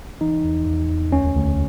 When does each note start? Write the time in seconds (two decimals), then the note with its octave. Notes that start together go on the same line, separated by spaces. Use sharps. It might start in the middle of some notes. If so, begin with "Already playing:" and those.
0.21 E3 D#4
0.44 E2
0.67 E2
0.90 E2
1.12 D2 C#4
1.36 D2